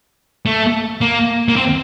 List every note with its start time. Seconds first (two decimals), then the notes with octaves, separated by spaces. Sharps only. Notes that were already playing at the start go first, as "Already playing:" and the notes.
0.46 A3
1.01 A#3
1.49 A#3
1.56 C4